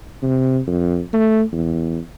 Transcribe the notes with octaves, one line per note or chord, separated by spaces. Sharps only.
C3
F2
A3
E2